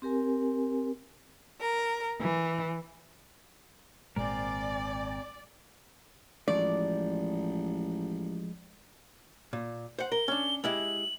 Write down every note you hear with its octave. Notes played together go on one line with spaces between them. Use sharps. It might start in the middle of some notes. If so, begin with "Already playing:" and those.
C4 G4 A#4 G#5
A#4
E3
G#1 A#2 G#3 C4 A#4 D5 G#5
A1 F3 G#3 D5
A#2
C5 F#5
A#4 G7
C#4 D4
G#3 E4 G4 F#7